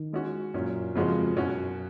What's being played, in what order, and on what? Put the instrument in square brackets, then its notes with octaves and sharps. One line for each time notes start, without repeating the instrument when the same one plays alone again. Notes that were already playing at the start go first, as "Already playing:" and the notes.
Already playing: [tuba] D#3
[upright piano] G#3 C#4 F#4
[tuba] F#2 [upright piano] A#2 F#3 C#4
[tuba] F2 [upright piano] C#3 F3 G#3 C#4 F#4
[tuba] F#2 [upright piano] B2 F#3 C#4 F#4